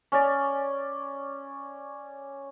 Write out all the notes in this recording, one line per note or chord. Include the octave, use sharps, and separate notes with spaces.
C#4 D5